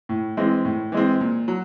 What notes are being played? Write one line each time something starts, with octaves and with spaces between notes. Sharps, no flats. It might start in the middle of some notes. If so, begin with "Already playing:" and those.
A2
E3 G#3 C4
A2
E3 G#3 C4
A#2
F#3